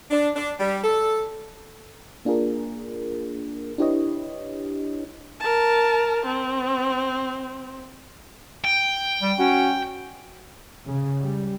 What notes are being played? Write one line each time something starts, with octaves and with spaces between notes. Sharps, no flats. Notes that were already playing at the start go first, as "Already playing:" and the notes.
D4
D4
G3
A4
A#3 D4 F4 G#4 A#4
D4 E4 G4 B4 C#5 D#5
A#4 A5
C4
G5
G3
C#4 F#4
C#3
G3